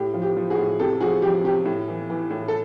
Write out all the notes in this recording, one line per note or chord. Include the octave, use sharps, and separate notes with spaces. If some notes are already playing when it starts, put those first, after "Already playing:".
Already playing: A2 G4
F3
G4
F3
F#4 G#4
A2
C3 G4 A4
F3 F#4 G#4
F3 G4
C3 G4
A2
E3
E3
A2
A4